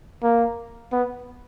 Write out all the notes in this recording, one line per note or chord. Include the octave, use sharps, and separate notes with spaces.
A#3
B3